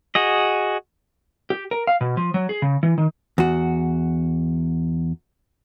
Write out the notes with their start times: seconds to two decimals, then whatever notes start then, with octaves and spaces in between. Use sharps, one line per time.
0.15 F#4 G#4 D#5
1.50 G4
1.71 A#4
1.87 F5
2.01 B2
2.17 F3
2.34 F#3
2.49 G#4
2.62 C#3
2.83 E3
2.98 D#3
3.38 E2 F#4